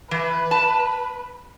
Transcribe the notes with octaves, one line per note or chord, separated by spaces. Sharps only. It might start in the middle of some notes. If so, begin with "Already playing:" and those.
E3 B4
A5